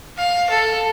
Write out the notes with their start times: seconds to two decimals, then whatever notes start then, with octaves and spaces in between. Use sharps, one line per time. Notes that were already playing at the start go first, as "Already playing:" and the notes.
0.17 F5
0.50 A4